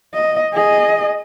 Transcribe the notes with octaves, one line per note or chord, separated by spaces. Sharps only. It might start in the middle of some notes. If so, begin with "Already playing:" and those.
D#5
G#4 D#5